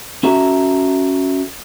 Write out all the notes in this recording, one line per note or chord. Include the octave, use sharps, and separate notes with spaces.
C#4 F#4 A4 E5 A#5